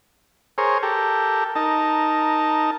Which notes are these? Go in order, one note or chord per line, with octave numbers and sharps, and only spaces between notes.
G#4 A#4 C5 C#5
G4 A4 A#4
D#4 A#4 A5